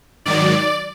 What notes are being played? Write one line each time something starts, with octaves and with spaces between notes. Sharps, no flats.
G#2 D#3 F#3 D5